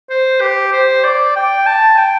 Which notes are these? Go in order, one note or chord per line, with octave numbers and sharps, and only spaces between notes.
C5
G4
C5
D5
G5
A5
G5